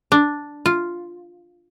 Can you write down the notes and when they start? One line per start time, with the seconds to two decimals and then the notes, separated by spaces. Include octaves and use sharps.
0.12 D4
0.66 F4